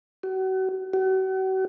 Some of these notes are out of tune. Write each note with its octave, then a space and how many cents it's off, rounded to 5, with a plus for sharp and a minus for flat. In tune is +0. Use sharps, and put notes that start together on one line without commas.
F#4 +35
F#4 +40